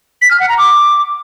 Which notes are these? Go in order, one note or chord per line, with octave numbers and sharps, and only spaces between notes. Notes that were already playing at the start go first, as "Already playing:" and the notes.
B6
F6
F#5
A#5
D6